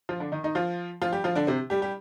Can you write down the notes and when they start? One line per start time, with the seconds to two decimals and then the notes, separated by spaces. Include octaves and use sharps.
0.09 F3 F4
0.20 D3 D4
0.32 D#3 D#4
0.43 D#3 D#4
0.55 F3 F4
1.02 F3 F4
1.12 G3 G4
1.24 F3 F4
1.35 D3 D4
1.47 C3 C4
1.70 G3 G4
1.82 G3 G4